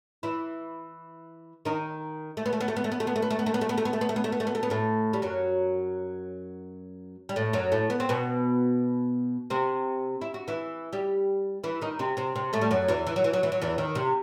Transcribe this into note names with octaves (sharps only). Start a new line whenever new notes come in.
E3 E4
D#3 D#4
A3
B3
A3
B3
A3
B3
A3
B3
A3
B3
A3
B3
A3
B3
A3
B3
A3
B3
A3
B3
A3
B3
A3
B3
A3
B3
A3
B3
A3
B3
A2 A3
G3
F#2 F#3
G3
A2 A3
F#2 F#3
A2 A3
B3
C4
B2 B3
C3 C4
E4
F#4
E3 E4
G3 G4
E3 E4
D#3 D#4
C3 C4
C3 C4
C3 C4
A2 A3
G3
F#2 F#3
E2 E3
E3
F#3
E3
F#3
E3
F#3
E2 E3
D#3
C3